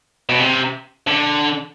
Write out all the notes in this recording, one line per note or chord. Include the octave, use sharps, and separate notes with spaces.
B2
C3
D3